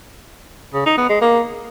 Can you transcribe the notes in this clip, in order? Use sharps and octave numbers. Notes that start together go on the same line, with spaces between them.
C#3
D#4
B3
G#3
A#3